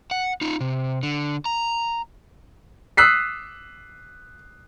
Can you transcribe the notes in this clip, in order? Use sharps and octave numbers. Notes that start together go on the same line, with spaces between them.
F#5
D#4 F4
C3
D3
A#5
D#6 E6 F#6 B6 C7